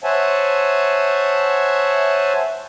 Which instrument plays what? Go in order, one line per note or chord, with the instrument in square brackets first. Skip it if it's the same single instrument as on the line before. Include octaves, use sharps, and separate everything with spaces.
[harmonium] C5 C#5 E5 F#5 G#5 A5